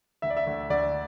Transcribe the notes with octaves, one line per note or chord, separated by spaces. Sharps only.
D2 E5
D5
E5
D2
D2 D5